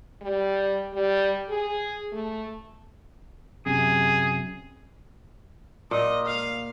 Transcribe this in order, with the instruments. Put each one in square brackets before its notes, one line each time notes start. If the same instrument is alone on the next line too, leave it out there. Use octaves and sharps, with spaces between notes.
[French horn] G3
G3
G#4
A3
[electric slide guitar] F#2 C3 [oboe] G#4
[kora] A#2 [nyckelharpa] D#5
[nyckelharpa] F5